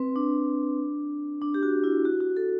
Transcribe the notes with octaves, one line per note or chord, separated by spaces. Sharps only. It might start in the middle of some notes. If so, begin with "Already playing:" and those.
Already playing: C4 B4
D4
D4
G4
F#4
E4
F#4
F#4
A4